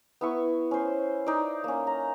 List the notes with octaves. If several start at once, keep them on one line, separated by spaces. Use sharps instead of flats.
B3 E4 C#6
C#4 C5
D#4 D5
A#3 C#4
A#5